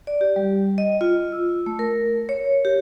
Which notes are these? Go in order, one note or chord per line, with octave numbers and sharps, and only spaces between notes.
D5
G4
G3
D#5
F4
E6
A3
A#4
C#5
G4